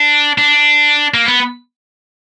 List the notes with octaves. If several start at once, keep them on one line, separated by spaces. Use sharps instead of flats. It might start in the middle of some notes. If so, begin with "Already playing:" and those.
Already playing: D4
D4
A#3
B3